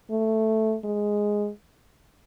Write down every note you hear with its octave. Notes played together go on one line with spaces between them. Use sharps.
A3
G#3